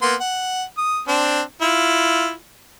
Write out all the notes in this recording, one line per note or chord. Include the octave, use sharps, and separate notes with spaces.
A#3 B3 C6
F#5
D#6
C4 D4
E4 F4